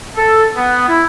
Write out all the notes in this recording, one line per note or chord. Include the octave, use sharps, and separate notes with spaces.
A4
B3
E4